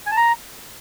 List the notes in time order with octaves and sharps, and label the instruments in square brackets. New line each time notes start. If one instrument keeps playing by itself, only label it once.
[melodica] G#5
A5
A#5